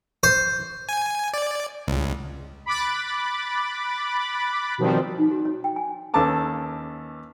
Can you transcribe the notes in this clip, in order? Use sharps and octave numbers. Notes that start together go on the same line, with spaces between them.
C5
G#5
D5
C#2
B5 D6 F#6 A6
B2 D#3 F3 G3 C4
D#4
F#4
C#5
G5
G#5
D#2 C#4 A4 B4 A5 D6